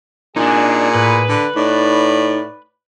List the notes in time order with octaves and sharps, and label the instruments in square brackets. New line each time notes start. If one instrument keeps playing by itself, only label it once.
[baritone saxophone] A#2 [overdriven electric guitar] D4 D#4 [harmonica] G#4 [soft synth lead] G#5
[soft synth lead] A2 [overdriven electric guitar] B4
[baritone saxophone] D3
[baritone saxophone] A2 [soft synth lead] D#4 [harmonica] D5